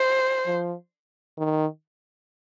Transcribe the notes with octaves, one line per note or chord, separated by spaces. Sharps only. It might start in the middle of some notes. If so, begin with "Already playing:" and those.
Already playing: C5
F3
D#3